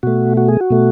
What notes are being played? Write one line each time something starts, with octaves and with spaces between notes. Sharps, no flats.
B2 A3 F#4
F#4
G#4
F#4
B2 A3